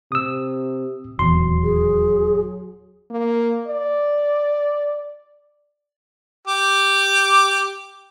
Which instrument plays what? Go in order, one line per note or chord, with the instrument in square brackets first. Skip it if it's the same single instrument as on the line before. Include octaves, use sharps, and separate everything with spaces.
[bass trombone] C3 [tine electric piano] D#6 E6
[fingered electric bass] D#1 E2 [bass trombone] F#3 [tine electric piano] C6
[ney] G#4
[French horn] A#3
D5
[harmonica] G4 D6